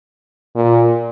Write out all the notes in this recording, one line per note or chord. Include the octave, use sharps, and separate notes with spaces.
A#2